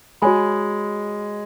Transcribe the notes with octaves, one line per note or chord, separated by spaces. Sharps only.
G#3 F#4 C#5 G#5 B5